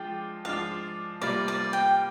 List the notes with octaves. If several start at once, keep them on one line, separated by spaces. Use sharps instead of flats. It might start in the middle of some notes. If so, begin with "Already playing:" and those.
Already playing: F3 G#3 D4 F4 G5
F3 G#3 D4 F4 F5
C3 G3 A#3 F4 D5
D5
G5